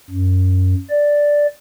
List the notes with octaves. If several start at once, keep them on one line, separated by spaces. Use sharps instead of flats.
F#2
D5